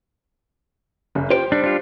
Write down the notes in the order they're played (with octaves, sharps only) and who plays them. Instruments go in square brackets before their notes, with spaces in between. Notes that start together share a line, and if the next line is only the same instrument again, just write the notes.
[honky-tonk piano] F#1
[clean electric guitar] F4 G5 [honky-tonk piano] G4 C5
[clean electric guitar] G3 [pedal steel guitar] D4
[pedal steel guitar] D4 F4